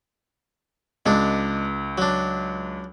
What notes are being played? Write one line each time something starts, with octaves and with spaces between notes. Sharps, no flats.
C#2 G#3 D4
F#3 D4